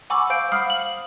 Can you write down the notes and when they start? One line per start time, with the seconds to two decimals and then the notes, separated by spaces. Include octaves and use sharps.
0.10 F#5 G#5 B5 C#6 D6 E6
0.30 C5 F5 G6 D7
0.52 F#5 B5 D#6 F6 C7
0.66 F5 F#7